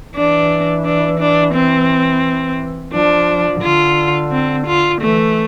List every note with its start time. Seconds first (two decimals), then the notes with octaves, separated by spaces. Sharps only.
0.15 E3 D4
0.85 D4
1.19 D4
1.54 C4
2.93 F3 D4
3.62 D3 F4
4.31 C4
4.67 F4
5.01 E3 A3